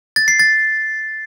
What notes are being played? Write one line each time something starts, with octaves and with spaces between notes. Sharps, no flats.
A6
C7
A6